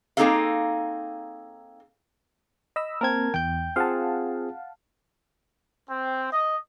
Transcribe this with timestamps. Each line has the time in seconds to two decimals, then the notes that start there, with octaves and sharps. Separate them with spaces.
0.17 A#3 C4 D#4 G#4 A4 F5
2.76 D#5 B5 E6
3.01 A#3 C4 A#4 A5 G#6
3.34 E2 G5 G6
3.76 C4 F4 G#4 F5 F#5 A5
5.89 C4
6.33 D#5